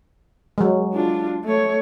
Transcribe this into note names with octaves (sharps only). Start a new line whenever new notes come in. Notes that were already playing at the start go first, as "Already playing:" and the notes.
F#3 G#3
D4 F4
A3 C#5